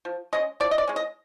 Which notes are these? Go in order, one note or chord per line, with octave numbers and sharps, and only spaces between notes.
F3
G#3 C#4 D#5
F3 D5
D#5
D5
G#3 C#4
D#5